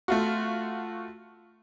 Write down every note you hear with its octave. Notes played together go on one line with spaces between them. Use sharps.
A3 F4 F#4